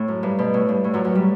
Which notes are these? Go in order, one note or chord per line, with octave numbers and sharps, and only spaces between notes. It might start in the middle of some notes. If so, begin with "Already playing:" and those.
Already playing: A2
F#2
G2
B2
A2
G2
A2
F#2 F#3
F#2 F#3
G3